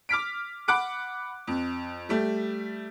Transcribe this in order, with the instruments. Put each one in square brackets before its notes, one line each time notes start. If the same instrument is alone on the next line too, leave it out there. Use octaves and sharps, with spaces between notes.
[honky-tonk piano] D6 F6 B6 D7
F#5 B5 D6 F#6 D7
F2
G3 A3 G4